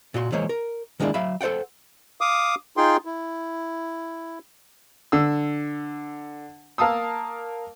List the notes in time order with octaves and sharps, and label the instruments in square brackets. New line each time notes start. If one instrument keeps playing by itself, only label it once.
[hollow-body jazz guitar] A#2 F#4 C6
E3 G#3 A#3 C5 C#5
A#4
D#3 G#3 A#3 D4 E4
F#3 E5 F5 B5
A4 C5 D5 F#5 G5
[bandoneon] F5 D6 D#6
D#4 F4 G#4 G5 C6
E4
[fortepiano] D3 E6
A#3 A#4 F5 A5 D#6 E6